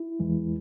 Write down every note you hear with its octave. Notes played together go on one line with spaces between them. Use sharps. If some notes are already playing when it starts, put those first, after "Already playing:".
Already playing: E4
E2 E3 G#3